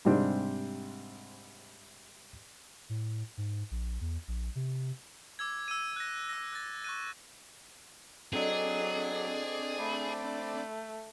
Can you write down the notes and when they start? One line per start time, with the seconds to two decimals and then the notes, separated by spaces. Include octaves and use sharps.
0.05 G#2 C3 G3 C4 D4
2.89 A2
3.37 G#2
3.71 A#1
4.01 E2
4.28 A#1
4.55 C3
5.39 D6 E6 G#6
5.68 E6 D#7
5.96 F#6 A#6
6.29 E6 A#6
6.53 F#6 A6
6.84 C#6 F#6 D#7
8.33 F#3 C4 D4 G#4 A4 D5 D#5
9.79 A3 B5